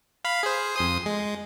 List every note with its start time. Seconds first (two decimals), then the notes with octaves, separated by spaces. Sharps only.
0.25 F5 B5
0.43 G#4 C5
0.76 F2 C6 D#6
1.06 G#3